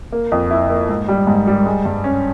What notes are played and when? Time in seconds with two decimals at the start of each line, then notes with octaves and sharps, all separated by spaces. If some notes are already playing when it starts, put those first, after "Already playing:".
0.12 A#3
0.32 F2
0.51 E4
0.70 A#3
0.89 G#2
1.08 G3
1.27 G#2
1.47 G3
1.66 G#3
1.85 G2
2.04 C#4